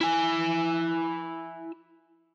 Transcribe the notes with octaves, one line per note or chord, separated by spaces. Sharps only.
E4 G#5